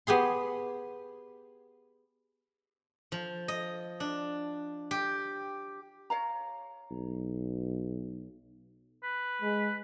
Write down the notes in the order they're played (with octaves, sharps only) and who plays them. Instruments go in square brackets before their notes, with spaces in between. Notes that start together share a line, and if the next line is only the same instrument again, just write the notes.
[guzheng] B3 G4 G#4 C6
F3
D#5
D4
G4
[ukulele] C#5 F5 A#5
[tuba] B1
[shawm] B4
[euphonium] G#3